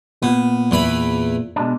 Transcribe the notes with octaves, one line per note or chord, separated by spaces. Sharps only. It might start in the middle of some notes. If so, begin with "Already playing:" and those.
A#2 B3
E2 E3 B5
B2 G#3 D4